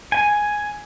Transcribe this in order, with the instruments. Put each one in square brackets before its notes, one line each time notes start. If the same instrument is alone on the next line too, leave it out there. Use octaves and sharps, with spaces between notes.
[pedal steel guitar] G#5